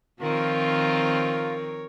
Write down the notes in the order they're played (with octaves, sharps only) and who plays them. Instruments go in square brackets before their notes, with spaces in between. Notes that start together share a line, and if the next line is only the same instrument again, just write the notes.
[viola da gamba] D#3 F3 C4 [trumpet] F4 [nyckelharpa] A#4 C#5